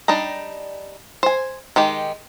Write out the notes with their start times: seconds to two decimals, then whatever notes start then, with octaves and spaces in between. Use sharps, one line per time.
0.08 G3 D4 D#4 A#5
1.23 C5 G#5
1.76 D#3 G#3 G4